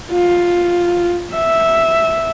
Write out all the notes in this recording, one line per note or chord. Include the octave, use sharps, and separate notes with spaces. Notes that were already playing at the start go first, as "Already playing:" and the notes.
F4
E5